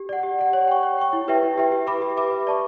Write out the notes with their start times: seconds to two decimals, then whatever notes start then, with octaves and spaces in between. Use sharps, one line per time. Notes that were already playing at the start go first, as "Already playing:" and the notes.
Already playing: G4
0.09 D5 F#5
0.23 G4
0.39 D5 F#5
0.53 C#5
0.68 G5 C#6
0.83 C#5
0.98 G5 C#6
1.13 E4
1.28 G4 B4 E5 G5
1.43 E4
1.57 G4 B4 E5 G5
1.72 G4
1.87 B4 E5 B5 D6
2.02 G4
2.17 B4 E5 B5 D6
2.32 B4
2.47 D5 A5 C#6